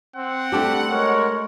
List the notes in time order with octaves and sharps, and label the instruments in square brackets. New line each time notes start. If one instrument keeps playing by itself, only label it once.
[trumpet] C4 [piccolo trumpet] F#5
[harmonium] G3 [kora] A3 D4 G4
[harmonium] G#3 A#4 [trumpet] C#5